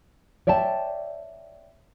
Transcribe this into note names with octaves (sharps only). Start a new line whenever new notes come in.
C#5 D5 E5 G5 A5